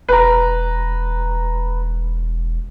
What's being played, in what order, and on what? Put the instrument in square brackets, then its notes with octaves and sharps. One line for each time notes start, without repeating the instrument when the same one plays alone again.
[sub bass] E1 [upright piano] B4 A#5